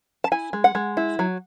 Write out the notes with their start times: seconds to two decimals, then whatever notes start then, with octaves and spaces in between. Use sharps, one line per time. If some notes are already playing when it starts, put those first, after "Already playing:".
0.24 A5
0.32 E4 G#5
0.53 G#3
0.64 F#5
0.75 G#3
0.97 E4
1.19 F#3